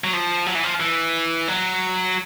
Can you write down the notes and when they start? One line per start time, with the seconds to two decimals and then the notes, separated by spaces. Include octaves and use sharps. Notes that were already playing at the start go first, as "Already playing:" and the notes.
0.04 F#3
0.13 F3
0.46 F#3
0.55 E3
0.64 F3
0.80 E3
1.48 F#3